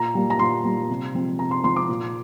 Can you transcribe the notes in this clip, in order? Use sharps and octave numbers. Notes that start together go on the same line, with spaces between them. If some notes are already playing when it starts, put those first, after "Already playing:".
Already playing: A#2 A#5
G3 A#3
A#5
A#2 C6
G3 A#3
C3
F3 G#3 C4
C3 A#5
C6
F3 G#3 C4 C6
D6
A#2